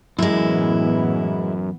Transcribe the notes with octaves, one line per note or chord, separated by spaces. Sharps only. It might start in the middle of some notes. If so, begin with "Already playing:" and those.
F#2 A2 E3 G#3 B3 E4